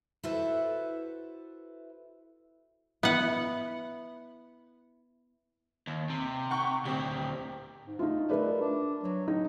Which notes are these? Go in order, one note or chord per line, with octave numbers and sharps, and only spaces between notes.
E4 F#4 A4 B4 C5 E5
B3 E4 F#5
D#2
C3
F#5 G5 C#6
D2 C4 G4
G#2
A3 D#4 F4
A3 A#4 B4 D5
D4
F#3
A2 D#4